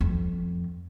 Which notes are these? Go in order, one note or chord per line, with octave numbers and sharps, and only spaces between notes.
F2